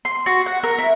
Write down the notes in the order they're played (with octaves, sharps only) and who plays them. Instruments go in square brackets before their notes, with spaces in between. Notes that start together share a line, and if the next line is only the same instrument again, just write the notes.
[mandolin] C6
F#4
F#5
A#4
E4